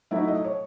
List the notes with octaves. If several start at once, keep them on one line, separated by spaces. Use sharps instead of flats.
F#3 A3 D#4 E4 E5
D#5
C#5